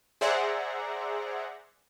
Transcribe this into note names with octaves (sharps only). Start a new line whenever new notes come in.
G#4 C5 D5 E5 F#5 A#5